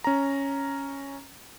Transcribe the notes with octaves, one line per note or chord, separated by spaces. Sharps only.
C#4 A#5